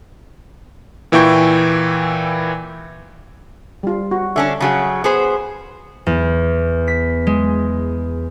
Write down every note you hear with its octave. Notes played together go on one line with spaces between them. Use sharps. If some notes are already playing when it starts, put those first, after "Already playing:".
A#2 E3 E4 G5 C#6 G6
G3 F4
F#4
D3 C#4 D4 E5
C#3 F#3 G#4 A5
B3 G#4 C5
E2
B6
G#3